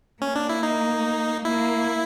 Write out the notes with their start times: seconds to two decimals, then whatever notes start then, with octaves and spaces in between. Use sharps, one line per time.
0.22 A#3 C#4
0.35 D4
0.49 E4
0.63 D#4
1.45 A#3 E4